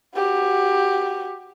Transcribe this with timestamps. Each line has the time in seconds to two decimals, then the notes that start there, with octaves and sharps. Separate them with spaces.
0.16 F#4 G4